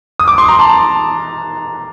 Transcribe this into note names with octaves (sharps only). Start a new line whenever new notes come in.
D#6
D6
C6
A#5
A5